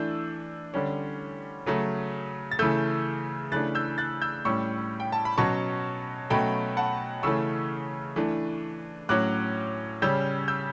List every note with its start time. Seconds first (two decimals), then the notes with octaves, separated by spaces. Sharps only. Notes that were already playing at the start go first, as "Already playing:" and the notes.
Already playing: E3 A3 D4 E6 G6
0.74 D3 G3 C#4
1.66 C#3 F#3 A3
2.51 A6
2.59 C#3 E3 A3 E6 G6
3.52 C#3 E3 A3 D4 F#6 A6
3.75 E6 G6
3.98 F#6 A6
4.22 E6 G6
4.45 A2 G3 C#4 C#6 E6
5.00 G5
5.12 A5
5.25 B5
5.37 B2 F#3 C#4 A5 C#6
6.30 B2 F#3 A3 C#4 G5 B5
6.77 F#5 A5
7.23 C#3 E3 A3 C#4 C#6 E6
8.16 E3 A3 D4
9.09 A2 F#3 C#4 D6 F#6
10.02 C#3 G3 C#4 E6 G6
10.48 E6 G6